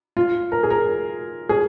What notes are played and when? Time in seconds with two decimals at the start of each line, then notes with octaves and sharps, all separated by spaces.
0.17 F4
0.52 A#4
0.63 G#4
0.70 A#4
1.49 G#4